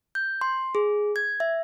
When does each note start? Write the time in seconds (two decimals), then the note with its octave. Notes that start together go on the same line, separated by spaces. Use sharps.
0.15 G6
0.41 C6
0.75 G#4
1.16 G#6
1.40 E5